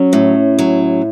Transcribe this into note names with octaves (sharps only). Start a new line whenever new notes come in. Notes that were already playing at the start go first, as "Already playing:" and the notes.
Already playing: F#3 C#4
A2
F#3